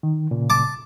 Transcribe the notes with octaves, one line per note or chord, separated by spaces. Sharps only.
D#3
A#2 C#3
A5 D6